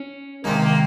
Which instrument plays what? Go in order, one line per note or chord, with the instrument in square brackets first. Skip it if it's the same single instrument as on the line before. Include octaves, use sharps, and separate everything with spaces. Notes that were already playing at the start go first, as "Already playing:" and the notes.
Already playing: [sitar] C#4
[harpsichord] C3 D#3 G#3 D#4 [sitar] A#3
[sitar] A#3